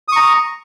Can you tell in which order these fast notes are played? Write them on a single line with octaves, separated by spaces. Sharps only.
D#6 C#6 A#5